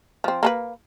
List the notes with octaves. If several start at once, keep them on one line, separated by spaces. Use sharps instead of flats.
F3 C4
A#3 A4 B4